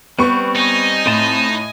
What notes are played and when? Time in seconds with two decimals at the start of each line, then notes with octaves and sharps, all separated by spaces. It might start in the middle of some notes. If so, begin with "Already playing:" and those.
0.19 G3 B3 C4 C#6
0.56 D#4 D#5 G#5
1.06 A2 C4 A5 C6